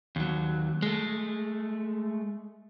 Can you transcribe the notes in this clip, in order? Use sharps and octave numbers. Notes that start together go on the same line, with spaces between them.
D#2 F#3
G#3 A3